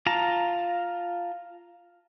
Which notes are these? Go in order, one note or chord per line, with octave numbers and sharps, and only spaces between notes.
F4 A5 A#5